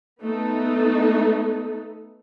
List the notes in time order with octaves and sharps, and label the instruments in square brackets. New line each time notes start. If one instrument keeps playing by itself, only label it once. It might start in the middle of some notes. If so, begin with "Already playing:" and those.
[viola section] A3 B3 D#4 A4